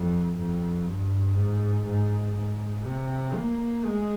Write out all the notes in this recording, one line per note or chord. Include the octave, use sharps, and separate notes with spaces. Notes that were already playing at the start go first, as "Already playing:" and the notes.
Already playing: F2
F2
G2
G#2
G#2
G#2
C3
A#3
G#3